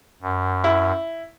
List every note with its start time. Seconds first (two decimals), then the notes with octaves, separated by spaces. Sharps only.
0.22 F#2
0.64 E4